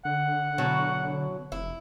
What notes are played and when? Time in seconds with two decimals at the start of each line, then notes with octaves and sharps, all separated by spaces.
0.05 D3 F#5
0.58 B2 F#3 E4
1.52 F1 E4